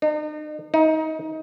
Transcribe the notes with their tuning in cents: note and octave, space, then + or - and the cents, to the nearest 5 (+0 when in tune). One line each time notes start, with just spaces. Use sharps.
D#4 -40
D#4 +25